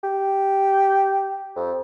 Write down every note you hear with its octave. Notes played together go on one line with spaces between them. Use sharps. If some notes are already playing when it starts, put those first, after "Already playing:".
G4
F2